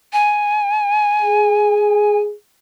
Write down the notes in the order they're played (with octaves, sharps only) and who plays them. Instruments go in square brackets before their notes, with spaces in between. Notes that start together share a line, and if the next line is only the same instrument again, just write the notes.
[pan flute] G#5
[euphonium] G#4